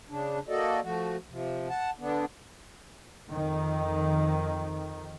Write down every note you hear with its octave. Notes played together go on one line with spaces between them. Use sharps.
C#3 D4
A#3 F#4 A4 D5 D#5
F3 A3 F#4
C3 F3
F#5 A5
D3 B3 D4
F2 D#3